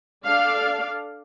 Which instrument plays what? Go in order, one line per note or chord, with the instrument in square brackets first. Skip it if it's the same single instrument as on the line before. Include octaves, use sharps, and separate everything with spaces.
[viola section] D4 A4 D5 F5